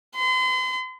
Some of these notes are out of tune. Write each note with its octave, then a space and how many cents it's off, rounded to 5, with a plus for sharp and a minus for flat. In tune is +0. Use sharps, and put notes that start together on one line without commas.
C6 -40